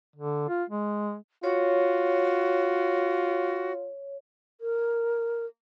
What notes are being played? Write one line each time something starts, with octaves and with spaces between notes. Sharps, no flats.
D3
F4
G#3
F4 F#4 C#5
A#4